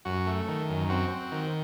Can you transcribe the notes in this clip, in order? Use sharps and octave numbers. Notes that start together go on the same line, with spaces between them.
F#2 F#4
A3
D#3
F#2
C4 F#4
C4
D#3